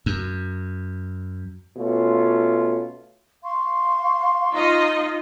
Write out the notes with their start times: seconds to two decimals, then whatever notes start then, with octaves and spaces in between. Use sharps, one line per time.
0.06 F#2
1.77 B2 A3 C#4 F4
3.44 F5 C6 C#6
4.53 D#4 F4 D#5